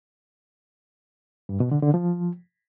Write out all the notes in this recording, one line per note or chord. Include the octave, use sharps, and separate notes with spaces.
G2
B2
D3
D3
F3